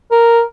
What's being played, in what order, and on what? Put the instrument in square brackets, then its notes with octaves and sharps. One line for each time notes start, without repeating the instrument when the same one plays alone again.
[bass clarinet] A#4